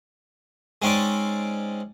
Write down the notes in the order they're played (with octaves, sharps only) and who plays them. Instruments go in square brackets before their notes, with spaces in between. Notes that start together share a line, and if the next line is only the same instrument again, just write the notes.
[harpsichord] G#3 C4 C#4 D#4 D5